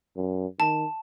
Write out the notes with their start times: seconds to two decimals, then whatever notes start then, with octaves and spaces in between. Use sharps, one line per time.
0.16 F#2
0.60 D#3 A5